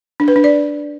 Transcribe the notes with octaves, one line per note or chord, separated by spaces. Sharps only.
D4
B4
D4
D5